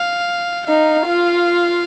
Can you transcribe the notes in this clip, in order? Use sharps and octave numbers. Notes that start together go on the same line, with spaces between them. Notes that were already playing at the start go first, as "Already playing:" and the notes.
Already playing: F5
D#4 F5
F4